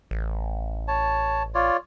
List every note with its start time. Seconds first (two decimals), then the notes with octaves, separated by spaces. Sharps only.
0.11 A1
0.88 C#5 A5
1.55 F4 C#5 D5